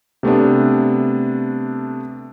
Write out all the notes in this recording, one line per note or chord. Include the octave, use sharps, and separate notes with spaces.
C3 A3 B3 D4